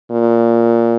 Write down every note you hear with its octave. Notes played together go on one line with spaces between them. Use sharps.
A#2